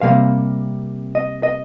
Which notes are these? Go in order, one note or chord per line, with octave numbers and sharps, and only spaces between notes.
C3 G3 A#3 F5
D#5
D#5